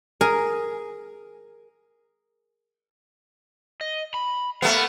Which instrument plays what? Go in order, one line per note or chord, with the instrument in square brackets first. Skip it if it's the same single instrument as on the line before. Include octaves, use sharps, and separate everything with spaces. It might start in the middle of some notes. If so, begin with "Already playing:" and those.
[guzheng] G#4 A#4 G#5
[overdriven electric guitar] D#5
B5
[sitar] A3 B3 [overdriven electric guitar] A#4 F5